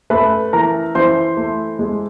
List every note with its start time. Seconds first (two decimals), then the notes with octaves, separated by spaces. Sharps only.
0.10 A3 B4 B5
0.53 E3 A#4 A#5
0.95 E3 C5 C6
1.37 A3
1.79 G#3